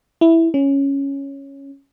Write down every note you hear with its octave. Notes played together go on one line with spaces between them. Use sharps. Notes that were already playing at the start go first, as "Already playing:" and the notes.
E4
C#4